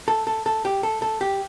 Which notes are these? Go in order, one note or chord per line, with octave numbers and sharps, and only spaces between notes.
A4
A4
A4
G4
A4
A4
G4